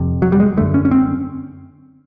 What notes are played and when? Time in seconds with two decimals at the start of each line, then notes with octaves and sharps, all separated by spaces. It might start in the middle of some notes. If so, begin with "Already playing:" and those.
Already playing: F2 C3
0.22 F#3
0.32 G3
0.40 G#3
0.57 D3 A3
0.61 F#2
0.74 C#4
0.85 C#4
0.91 C4